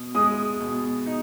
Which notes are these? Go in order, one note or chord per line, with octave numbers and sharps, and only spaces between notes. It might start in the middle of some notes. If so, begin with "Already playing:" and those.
Already playing: B2
G#3 D#6
B2
D#4